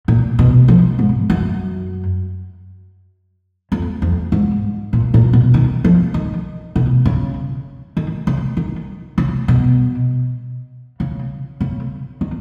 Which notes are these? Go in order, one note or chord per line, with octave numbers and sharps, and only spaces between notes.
A#2
B2
F3
G#2
F#2
F2
F2
G#2
A#2
A#2
B2
D#3
F3
D#3
B2
C#3
D#3
C#3
D#3
C#3
B2
C#3
C#3
D#3